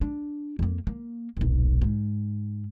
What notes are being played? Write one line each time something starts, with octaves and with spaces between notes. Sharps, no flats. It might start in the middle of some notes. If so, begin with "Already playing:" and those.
D4
F2 A#3
A#3
D#1 B1
G#2